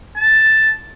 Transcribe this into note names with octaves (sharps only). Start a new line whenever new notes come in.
A5